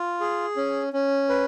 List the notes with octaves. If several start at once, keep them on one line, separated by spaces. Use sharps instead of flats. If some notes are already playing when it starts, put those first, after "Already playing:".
Already playing: F4
G#4
C#4
C#4
B4